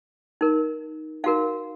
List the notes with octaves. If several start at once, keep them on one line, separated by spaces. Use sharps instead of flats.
D#4 A#4
D#4 F#4 A#4 F5